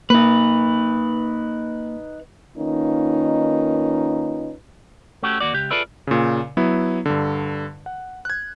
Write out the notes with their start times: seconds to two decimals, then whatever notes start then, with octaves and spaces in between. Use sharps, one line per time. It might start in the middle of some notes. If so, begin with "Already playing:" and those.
0.10 A#3 D#4 B4
2.58 D#3 A#3 C#4 D#4 F4 B4
5.23 A3 C#4 F#4 G4 A4
5.40 D#2 A#3 F#4 D5
5.54 C#2 G4
5.70 F4 G#4 A4 B4 D5 E5
6.07 A#2 C#3
6.57 F#3 B3 E4
7.06 G2 D3
7.86 F#5
8.25 F#6 G#6